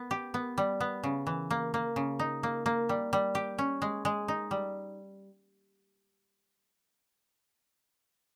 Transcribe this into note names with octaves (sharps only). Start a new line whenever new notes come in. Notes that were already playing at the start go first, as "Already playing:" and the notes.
Already playing: B3
G4
B3
G3
B3
C#3
E3
A#3
A#3
C#3
D#4
A#3
A#3
G3
G3
G4
C#4
G#3
G#3
D#4
G3